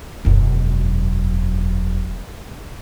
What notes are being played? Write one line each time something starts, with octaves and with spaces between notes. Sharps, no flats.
E1 F#2